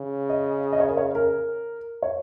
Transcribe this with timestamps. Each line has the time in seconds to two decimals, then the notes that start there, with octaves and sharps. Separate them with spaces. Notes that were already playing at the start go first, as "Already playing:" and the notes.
Already playing: C#3
0.29 D#5
0.72 D#5
0.80 C#5
0.89 A#4
0.97 C#5
1.15 A#4
2.02 C#5